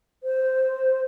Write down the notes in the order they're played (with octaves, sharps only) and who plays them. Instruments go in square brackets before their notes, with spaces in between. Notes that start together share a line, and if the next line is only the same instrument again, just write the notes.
[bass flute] C5